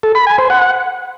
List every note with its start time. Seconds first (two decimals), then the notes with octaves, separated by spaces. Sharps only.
0.03 A4
0.15 B5
0.27 G#5
0.38 C5
0.50 F#5